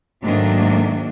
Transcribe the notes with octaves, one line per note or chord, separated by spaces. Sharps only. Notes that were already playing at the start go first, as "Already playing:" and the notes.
G#2 D#3 F#3 A3 A#3 D4